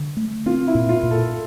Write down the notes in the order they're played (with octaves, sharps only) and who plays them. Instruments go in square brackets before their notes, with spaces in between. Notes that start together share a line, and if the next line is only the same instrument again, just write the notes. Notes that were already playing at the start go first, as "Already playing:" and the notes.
Already playing: [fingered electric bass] D3
A3
[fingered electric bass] C4 [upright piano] F4
[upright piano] E4
[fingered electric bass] A#2
[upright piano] F4
[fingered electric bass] A#2
[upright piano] A4